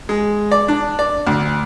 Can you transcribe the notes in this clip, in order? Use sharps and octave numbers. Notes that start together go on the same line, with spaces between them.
G#3
D5
D4
D5
D2